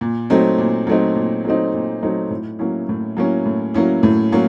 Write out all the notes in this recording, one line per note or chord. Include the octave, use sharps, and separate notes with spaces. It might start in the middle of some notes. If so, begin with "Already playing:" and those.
A#2
F#3 A3 C4 D#4
A#2
F#3 A3 C4 D#4
A#2
F#3 A3 C4 D#4
A#2
F#3 A3 C4 D#4
A2
F#3 A#3 C#4 E4
A2
F#3 A#3 C#4 E4
A2
F#3 A#3 C#4 E4
A2
F#3 A#3 C#4